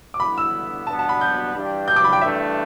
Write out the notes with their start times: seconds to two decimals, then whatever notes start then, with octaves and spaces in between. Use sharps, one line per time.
0.14 D6
0.20 G2 D3 B3 E4 B5
0.38 E6
0.87 B2 G3 B3 D4 A5
0.99 A5
1.09 B5
1.21 G6
1.54 G2 E3 G3 D4 G4
1.88 G6
1.96 D6
2.04 B5
2.13 G5
2.21 G2 E3 A3 D4 G4 E5